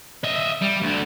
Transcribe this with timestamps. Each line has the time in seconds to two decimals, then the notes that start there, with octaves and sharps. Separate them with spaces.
0.24 D#5 E5
0.61 G3
0.82 D2 D3